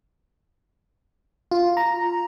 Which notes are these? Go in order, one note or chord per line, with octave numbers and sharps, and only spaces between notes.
F4
A#5